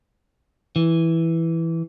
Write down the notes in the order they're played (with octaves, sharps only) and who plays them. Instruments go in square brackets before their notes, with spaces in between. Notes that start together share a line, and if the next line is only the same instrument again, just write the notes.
[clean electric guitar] E3